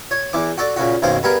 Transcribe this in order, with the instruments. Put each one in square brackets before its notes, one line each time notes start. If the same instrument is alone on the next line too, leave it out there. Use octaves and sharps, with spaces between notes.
[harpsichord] C#5
E2 E3 D6
F#4 A4 D5
A#2 C#3 F#4
B1 F#2 D#3 A#3 C5
G2 B3 G#4 A#4